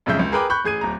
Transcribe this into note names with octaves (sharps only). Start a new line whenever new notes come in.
B1 F2 C#3 G#3 E5 G6
C#2
G#4 A#4 B4 G5 B5 D6
B5 C#6 F#6 G6
A1 G#4 G#6 D#7
D1 A#5